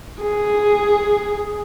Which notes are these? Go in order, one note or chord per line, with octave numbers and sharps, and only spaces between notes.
G#4